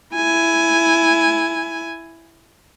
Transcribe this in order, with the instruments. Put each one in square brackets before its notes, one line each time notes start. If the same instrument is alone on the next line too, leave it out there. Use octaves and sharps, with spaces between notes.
[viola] E4 G#5